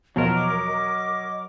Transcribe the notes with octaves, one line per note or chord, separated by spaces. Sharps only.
E2 B2 F3 F#3 A#4 D#5 A5
D6